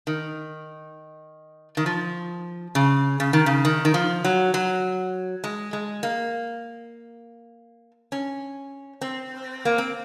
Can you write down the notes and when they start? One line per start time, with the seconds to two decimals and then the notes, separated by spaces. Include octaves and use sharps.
0.07 D#3
1.77 D#3
1.86 F3
2.75 C#3
3.20 C#3
3.33 D#3
3.46 C#3
3.65 D#3
3.85 D#3
3.94 F3
4.25 F#3
4.54 F#3
5.44 G#3
5.73 G#3
6.03 A#3
8.12 C#4
9.01 C4
9.65 A#3
9.78 C4